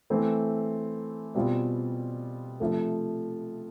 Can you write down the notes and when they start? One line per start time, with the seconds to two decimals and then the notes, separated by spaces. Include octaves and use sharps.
0.10 E3 A3 C4
1.35 B2 G3 C4 F4
2.60 C3 F3 A3